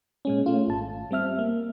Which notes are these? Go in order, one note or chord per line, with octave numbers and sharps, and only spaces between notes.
A#2 G#3 C#4
A3 C#4 F4
G#1 A5
G3 C4 E5 F6
A#3